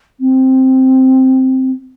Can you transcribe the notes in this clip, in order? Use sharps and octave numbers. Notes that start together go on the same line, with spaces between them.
C4